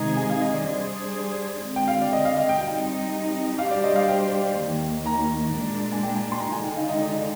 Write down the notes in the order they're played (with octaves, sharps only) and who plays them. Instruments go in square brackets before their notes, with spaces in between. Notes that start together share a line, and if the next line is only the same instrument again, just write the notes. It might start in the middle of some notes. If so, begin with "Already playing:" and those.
Already playing: [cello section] C3 D#3 G#3 D#4 G#4 [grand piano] D#5 A#5
[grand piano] G#5
F5
D#5
D5
[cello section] G3 D4 G#4 C5
D3 G#3 C4
[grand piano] G5
F5
D5
D#5
F5
D#5
G5
[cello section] G3 C4 D#4 [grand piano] G5
[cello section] G3 D4 G4 C5 [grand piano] F5
[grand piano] D5
D#5
F5
G5
[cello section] D#2 D#3 A#3
[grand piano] A#5
[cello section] A#2 G#3 D4
[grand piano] G#5
G5
G#5
C6
A#5
[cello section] D3 G#3 D#4 [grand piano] G#5
[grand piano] G5
F5
D#5
D5